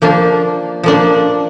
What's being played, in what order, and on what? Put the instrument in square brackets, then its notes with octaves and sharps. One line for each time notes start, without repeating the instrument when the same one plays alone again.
[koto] F3 A#3 D4
F3 A#3 D4